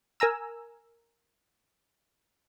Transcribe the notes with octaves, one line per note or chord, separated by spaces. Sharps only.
A#4 G#5 A#5 E6